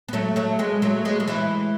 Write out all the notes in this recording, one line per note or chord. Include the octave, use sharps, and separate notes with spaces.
B3
F#3 A3
F#3 A3
G#3 B3
F#3 A3
G#3 B3
F#3
E3 G#3